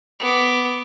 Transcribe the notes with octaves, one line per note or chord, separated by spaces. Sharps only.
B3 D6